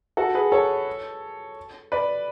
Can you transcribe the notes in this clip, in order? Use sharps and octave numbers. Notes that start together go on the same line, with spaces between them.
F#4 A4
G#4 B4
A4 C#5
B4 D5